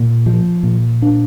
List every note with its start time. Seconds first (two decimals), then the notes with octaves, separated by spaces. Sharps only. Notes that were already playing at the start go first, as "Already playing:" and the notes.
Already playing: A#2
0.26 F3
0.63 A#2
1.02 D4